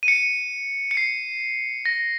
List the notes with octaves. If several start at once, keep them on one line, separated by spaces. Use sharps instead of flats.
D#7
C#7
C#7
C7
A#6